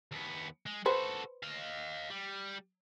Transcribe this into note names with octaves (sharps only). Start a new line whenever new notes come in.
D#2 B3
G#3
F#4 A4 B4 C5
D#5 F5
G3